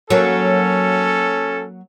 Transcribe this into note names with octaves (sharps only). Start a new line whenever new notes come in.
F#3 A#3 C#4 A4